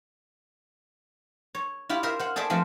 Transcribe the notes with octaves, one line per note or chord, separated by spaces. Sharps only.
C#5
E4 F4 G4 B5
A#4 C5 E5 F5
C5 F#5
G#4 A4 C5 D5 E5
F3 A3 C4